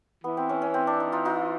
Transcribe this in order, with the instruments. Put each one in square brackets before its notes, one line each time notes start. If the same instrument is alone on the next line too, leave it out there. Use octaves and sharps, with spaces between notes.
[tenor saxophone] E3 [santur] B3
[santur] C4
C#4
C#4
C4
D4
D#4
D#4 F4
D#4 F4